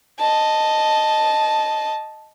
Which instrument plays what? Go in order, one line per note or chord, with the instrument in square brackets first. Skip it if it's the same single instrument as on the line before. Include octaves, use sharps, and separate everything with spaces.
[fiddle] D#5 A5